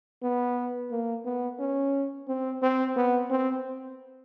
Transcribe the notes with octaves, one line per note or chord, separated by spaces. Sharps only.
B3
A#3
B3
C#4
C4
C4
B3
C4